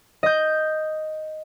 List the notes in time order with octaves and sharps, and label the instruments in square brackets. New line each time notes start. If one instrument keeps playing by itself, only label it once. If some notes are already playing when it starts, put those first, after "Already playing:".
[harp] D#5 G6